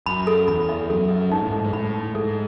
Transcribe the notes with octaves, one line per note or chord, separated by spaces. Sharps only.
F#2 B5
A4
E2 B5
E5
F#2 A4
E5
G#2 D#4
A2
G#2 A4
G#2
A2 B5
D#4
G#2 A4